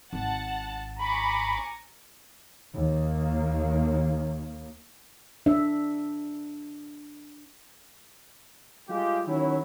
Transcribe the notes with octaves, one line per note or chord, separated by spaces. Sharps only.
G#1 F#5 A5
G#5 A#5 B5 C#6 D6
D#2 A#3
D4 E5
G3 G#3 F4 G4
D#3 F#3 C#4 E4